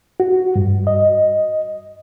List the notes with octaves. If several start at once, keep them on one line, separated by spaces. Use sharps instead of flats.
F#4
G2
D#5